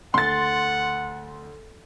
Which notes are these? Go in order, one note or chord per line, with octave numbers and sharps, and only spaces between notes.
D2 F#5 C6 A6